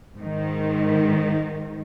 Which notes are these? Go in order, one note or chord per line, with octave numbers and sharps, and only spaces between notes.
G#2 D#3